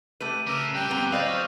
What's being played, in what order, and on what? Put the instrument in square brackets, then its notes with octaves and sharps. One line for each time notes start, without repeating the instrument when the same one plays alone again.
[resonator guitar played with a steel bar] A3 G4 B4 [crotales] D#7
[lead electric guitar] C#3 [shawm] A#4 [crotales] D6 E6
[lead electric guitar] D2 G3 [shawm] G5 [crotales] F#6
[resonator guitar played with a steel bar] B3 C4 A#5
[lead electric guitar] B4 [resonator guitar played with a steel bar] C5 D5 F5 [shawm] D#5 [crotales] G6 F7
[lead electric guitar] F#3 [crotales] C#6 F6 G6